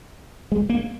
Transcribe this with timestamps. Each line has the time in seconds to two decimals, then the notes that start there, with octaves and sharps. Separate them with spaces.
0.52 G#3
0.70 A#3